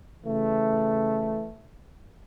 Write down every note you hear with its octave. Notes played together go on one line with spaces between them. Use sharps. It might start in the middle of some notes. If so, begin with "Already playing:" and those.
C#3 E3 A3